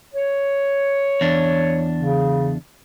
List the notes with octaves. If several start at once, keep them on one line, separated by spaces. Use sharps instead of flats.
C#5
E2 D4
C#3